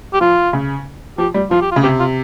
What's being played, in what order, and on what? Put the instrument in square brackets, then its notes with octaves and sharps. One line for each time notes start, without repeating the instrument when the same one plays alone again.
[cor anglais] G4
[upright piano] F3 [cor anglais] F4
[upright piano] C#3
[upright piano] F3 [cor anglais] G4
[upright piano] G3
[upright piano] F3 [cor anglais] F4
[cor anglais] G4
F4
[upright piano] C#3
[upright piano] C3 [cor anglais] G4
[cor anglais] F4